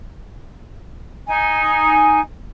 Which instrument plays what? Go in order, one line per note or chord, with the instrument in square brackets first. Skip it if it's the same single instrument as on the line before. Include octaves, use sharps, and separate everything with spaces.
[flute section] D#4 G#5